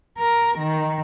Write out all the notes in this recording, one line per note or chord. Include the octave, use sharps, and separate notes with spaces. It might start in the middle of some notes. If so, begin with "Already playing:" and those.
A#4
D#3